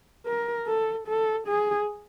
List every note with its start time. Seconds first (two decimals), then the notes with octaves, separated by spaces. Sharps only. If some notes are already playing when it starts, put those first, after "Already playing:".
0.26 A#4
0.67 A4
1.08 A4
1.47 G#4